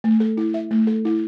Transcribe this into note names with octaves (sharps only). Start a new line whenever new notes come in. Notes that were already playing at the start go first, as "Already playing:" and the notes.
A3
A4
E4
E5
A3
A4
E4